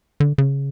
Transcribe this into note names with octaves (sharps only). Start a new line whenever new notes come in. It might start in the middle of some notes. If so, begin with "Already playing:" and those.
D3
C#3